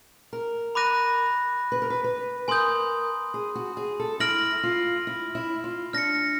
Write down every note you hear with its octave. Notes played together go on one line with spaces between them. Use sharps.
A#4
B5 D6 F#6 A#6 D#7
B4
A#4
B4
B4
A#4 G#5 C6 D#6 G6
G#4
F#4
G#4
A4
E4 F6 A#6 D7 F#7
F4
E4
E4
F4
D4 F6 A#6 C#7